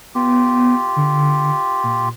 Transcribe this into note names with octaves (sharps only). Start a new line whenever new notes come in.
B3 F4 G4
D3
A#2